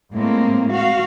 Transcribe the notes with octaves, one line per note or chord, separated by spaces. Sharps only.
A2 G#3 A#3 C4
F#4 F5